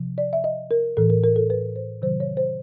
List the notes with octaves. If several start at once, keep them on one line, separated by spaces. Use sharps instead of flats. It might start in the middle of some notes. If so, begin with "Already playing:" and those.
Already playing: C3 F3
D5
E5
D#5
A#4
A2 E3 A4
A#4
A#4
A4
B4
C5
C3 D#3 F#3 C5
C#5
C5